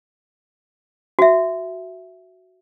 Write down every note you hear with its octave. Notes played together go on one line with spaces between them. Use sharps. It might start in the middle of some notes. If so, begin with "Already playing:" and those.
F#4 E5